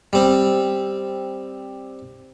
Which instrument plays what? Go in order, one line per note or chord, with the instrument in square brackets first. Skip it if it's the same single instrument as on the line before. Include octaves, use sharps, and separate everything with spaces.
[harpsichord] G3 C4